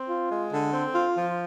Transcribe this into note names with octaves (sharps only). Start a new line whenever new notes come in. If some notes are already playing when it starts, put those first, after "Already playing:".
Already playing: C4
F4
G#3
D3
C4
F4
F3